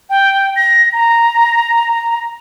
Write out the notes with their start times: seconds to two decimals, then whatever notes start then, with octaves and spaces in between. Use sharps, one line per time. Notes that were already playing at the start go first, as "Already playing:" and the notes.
0.10 G5
0.56 A#6
0.93 A#5